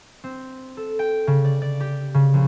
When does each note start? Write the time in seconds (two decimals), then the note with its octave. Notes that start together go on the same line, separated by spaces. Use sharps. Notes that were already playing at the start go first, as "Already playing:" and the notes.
0.24 C4
0.77 A4
0.99 G5
1.27 C#3
1.45 D5
1.62 D5
1.80 G4
2.14 C#3
2.34 A#1